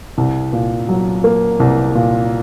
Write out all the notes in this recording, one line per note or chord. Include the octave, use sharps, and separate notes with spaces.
C2
A#2
F#3
A#3
C2
A#2